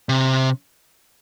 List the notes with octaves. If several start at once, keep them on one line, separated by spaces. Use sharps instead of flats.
C3